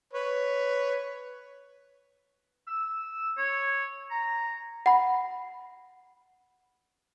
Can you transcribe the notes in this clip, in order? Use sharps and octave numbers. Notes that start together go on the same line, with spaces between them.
B4 C#5
E6
C#5
A#5
F#5 B5